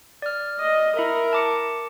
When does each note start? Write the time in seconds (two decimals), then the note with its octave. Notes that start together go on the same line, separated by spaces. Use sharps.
0.22 D5 F6
0.60 D#5
0.97 E4 A#4 E5
1.33 A5 D6 C#7